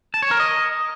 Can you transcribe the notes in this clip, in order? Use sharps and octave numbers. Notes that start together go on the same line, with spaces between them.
A5
C#5
A#4
D#5